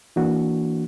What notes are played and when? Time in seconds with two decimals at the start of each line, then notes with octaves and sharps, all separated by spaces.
0.16 E3 A#3 D4 F#4